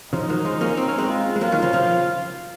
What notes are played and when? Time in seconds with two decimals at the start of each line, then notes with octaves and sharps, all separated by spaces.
0.13 C#3 F3 D#4
0.29 D#3 F#3
0.45 F3 G#3
0.61 A#3 C#4
0.77 C4
0.88 C#4
0.98 G#3 C4
1.10 F4
1.36 G#3
1.41 F#3 A#3 F4
1.52 D#3 F#3
1.62 C#3 F3
1.73 C#3 F3